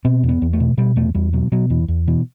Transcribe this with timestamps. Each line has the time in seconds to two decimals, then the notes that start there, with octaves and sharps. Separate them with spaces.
0.05 B2 C4
0.23 E2
0.29 B3
0.42 E2
0.53 A3
0.60 B2
0.77 B2 G3
0.96 E2 A3
1.15 E2 G3
1.33 B2 F#3
1.52 B2 F#3
1.70 E2 E3
1.88 E2
2.07 B2 E3